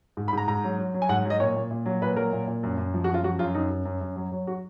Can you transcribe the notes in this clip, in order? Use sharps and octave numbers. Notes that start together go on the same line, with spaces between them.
G#2
B5
G#2 A#5
G#2 A#5
F#3
F#3
F#3
G#5
G#2 F#5
F#3
D#5
A#2 C#5
A#2
A#2
F#3
A#2 B4
F#3 A#4
A#2
A#2
F#2
F#2
F3
F#4
F#2
F4
F3 F#4
F#2 F4
F#2 D#4
F#2
F#2
F#2
F#3
F#3
F#4